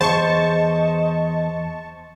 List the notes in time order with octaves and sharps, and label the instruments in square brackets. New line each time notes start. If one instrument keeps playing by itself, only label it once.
[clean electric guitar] E2 G#4 C6 [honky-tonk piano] C5 [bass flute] D#5 [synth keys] A5 C#6